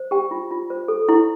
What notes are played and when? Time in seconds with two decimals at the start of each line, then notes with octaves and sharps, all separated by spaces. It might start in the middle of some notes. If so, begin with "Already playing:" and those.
Already playing: C5
0.11 G4 G5
0.31 F4
0.51 F4
0.70 C5
0.88 A4
1.09 E4